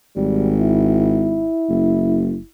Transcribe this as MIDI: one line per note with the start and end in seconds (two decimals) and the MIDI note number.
0.16 1.50 32
0.16 0.53 55
0.60 2.48 64
1.69 2.38 30